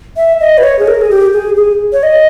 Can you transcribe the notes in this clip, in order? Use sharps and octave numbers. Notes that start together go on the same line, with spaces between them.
E5
D#5
B4
C#5
G#4
A#4
G#4
G4
G#4
G#4
C#5
D#5